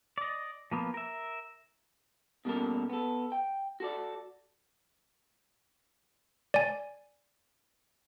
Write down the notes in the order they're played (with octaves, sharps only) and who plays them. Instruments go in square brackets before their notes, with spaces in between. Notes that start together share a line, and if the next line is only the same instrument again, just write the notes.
[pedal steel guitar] D5 D#5
F3 A#3 B3
A#4 E5
[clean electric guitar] B2 G3 A#3 C#4 A4 A#4
B3 A4
G5
F#4 A4 D5
[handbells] D5 G#5